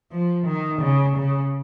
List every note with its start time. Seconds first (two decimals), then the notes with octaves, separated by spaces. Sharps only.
0.12 F3
0.46 D#3
0.81 C#3
1.16 C#3